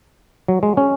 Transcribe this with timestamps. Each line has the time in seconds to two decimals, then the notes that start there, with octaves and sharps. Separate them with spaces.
0.48 F#3
0.63 G#3
0.77 C#4